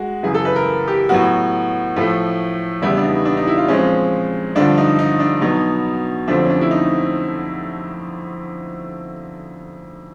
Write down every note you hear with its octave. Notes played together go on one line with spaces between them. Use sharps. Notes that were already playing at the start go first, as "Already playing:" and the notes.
Already playing: G#3 F#4
F#2 C#3 E3 G#4
A4
B4
A#4
G4
A2 F#3 B3 F#4
A2 F3 A3
E2 C#3 E3 G3 B3 E4
D4
D#4
D4
D#4
E4
F4
A#2 F3 G#3 C4 C#4
G2 D3 F3 D4
D#4
D#4
D4
B2 F#3 B3 D#4
F2 D3 F3 A3 C4 D4
C#4
D4
E4
D#4